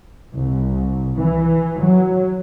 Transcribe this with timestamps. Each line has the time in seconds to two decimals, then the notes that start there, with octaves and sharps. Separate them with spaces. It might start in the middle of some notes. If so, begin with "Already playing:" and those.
0.34 C2
1.17 E3
1.79 F#3